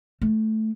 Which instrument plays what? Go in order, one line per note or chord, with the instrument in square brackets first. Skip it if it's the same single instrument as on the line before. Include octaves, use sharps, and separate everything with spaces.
[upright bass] A3